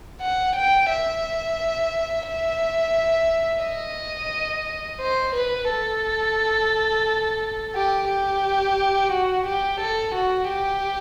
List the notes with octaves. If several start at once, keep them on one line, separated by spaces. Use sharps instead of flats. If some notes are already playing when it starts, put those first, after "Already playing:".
F#5
G5
E5
E5
D#5
C5
B4
A4
G4
G4
F#4
G4
A4
F#4
G4